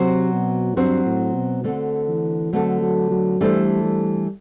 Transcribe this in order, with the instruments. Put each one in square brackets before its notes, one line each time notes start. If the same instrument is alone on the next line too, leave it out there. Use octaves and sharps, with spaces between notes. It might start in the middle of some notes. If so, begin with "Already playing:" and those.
Already playing: [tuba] C3 [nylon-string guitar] F#3 C4 F#4 C5
[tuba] B2
[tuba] G2 [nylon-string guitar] F#3 C4 F#4 C5
[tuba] A2
B2
[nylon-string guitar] D3 A3 C4 F#4 A4
[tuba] E3
[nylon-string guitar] D3 A3 C4 F#4 A4 [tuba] F#3
[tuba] F#3
F#3
[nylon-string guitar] E3 A3 D4 A4 C5 [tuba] G3
[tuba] G3